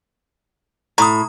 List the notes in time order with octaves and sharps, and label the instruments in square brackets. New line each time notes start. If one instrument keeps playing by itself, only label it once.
[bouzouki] A2 [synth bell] A#5 D#6